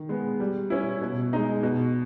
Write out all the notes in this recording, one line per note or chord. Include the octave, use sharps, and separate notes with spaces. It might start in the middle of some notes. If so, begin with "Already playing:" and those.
Already playing: D#3
G#3 B3
G3
C#4 E4
B2
G#3 D#4
B2